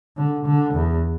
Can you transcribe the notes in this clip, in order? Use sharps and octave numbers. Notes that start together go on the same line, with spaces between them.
D3
D3
E2